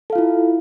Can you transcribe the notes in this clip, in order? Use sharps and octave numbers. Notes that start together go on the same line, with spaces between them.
E4 F4 A4 F5